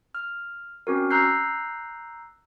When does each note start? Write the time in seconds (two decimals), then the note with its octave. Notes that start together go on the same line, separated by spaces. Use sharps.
0.15 F6
0.87 C4 C#4 F#4 A#4
1.10 A#5 E6 F#6 G6 C7